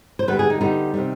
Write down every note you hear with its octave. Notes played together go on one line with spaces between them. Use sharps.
C5
D3 G3 B3 B4
G#4
D#4
D3 G3 B3 D#4
C3 D#3 G3